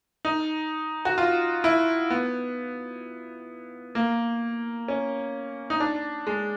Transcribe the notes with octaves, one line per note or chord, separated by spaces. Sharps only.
D#4
F#4
F4
E4
B3
A#3
C#4
D#4
D4
G#3